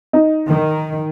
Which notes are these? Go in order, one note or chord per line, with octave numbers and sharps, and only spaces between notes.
D#4
D#3